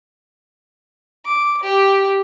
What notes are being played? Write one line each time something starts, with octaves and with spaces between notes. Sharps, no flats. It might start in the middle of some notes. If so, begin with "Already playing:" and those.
D6
G4